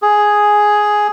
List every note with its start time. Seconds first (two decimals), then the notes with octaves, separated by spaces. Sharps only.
0.02 G#4